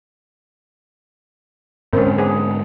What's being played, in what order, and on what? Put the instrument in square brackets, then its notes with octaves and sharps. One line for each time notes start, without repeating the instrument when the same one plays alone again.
[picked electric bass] G#2 D3 G#3 [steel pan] C4 C#4 [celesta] A#4
[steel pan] B3 G#4